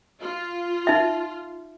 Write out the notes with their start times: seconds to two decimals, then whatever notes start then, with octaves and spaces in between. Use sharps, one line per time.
0.19 F4
0.87 D#4 E5